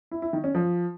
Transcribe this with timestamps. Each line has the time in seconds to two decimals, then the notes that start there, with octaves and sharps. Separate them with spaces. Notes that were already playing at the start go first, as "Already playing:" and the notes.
0.11 E4
0.22 E4
0.33 D#3
0.44 C#4
0.55 F3